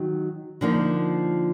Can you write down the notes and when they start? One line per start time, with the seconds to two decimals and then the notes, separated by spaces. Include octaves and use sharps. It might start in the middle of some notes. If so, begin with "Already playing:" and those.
Already playing: D#3 F#3
0.61 D3 F3 A#3 D#4